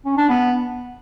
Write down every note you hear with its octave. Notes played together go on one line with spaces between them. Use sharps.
C#4
D4
B3